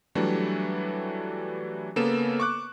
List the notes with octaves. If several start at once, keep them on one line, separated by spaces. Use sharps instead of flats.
E3 F#3 G3 A3 D4
C#3 A#3 B3 A4 E7
C#6 D6 F#6